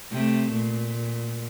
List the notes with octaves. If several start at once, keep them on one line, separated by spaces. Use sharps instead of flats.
C3 A3
A#2